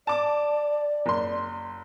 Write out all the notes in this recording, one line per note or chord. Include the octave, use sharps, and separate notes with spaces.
D5 A5 D6
F#1 C6